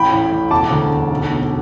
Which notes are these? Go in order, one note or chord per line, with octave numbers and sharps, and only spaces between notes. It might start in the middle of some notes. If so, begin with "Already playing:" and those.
Already playing: A1 G5 B5
A2
A1
E1 A5 D6
D2
E1
B1
B2